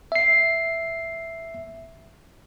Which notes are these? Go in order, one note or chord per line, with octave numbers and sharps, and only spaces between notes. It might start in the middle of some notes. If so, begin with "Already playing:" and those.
E5 C7